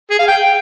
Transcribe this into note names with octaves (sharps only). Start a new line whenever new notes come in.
G#4
F5
G5